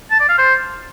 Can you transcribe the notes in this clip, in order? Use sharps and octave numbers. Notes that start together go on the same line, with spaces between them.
A5
D5
F5
C5